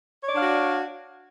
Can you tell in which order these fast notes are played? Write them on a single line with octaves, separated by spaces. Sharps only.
C#5 D5 D4 F5 F#4